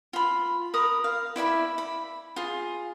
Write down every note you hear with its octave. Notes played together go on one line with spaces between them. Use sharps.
F4 B5
A#4 B5 D#6
F5
E4 D5 E5 B5
B5
F4 G#4